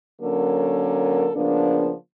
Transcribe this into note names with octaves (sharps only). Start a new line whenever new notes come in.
D3 F#3 A#3 C#4 A4 A#4
C#3 F3 A#3 B3 D4